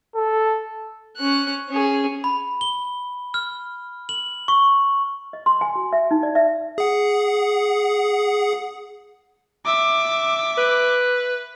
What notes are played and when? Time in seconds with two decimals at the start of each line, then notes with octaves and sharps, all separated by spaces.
0.15 A4
1.17 C#4 F#6
1.70 C#4 G#4
2.24 B5
2.61 G7
3.34 F6
4.09 F#7
4.48 C#6
5.33 D#5
5.46 C6
5.61 G#5
5.75 F#4
5.93 E5
6.11 D#4
6.23 D5
6.35 E5
6.78 G#4 F#5
9.66 E5 D6
10.58 B4